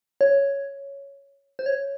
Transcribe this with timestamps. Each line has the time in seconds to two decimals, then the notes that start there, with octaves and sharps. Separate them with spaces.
0.21 C#5
1.59 C5
1.66 C#5